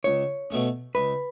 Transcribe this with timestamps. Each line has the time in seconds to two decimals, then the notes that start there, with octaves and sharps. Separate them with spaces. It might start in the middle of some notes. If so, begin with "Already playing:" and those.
0.04 C#2 C#5
0.50 B2 A3 C#4
0.95 C#2 B4